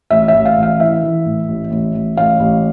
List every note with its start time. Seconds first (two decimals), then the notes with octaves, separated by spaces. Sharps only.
0.10 A1 E5
0.28 E5
0.34 A1
0.45 F5
0.58 A1
0.63 F5
0.80 E3 E5
1.03 E3
1.26 A2
1.48 A1
1.71 A1
1.94 A1
2.17 A1 F5
2.40 A1